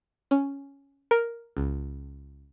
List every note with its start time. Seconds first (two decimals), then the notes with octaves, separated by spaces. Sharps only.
0.31 C#4
1.11 A#4
1.57 C#2